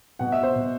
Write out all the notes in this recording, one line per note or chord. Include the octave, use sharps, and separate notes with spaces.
B2 F#5
E5
C5
B2